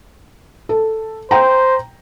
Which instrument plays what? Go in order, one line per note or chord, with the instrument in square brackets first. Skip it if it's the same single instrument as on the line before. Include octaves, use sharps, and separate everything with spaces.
[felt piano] A4
[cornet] C5 [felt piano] G5 A#5